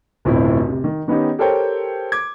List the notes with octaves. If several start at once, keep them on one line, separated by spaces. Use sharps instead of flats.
D1 B1 F2 A2 C4 E4
C3
D#3
D#3 B3 C#4 D#4 G4
G4 A4 A#4 C5 C#5 G5
D6 G#6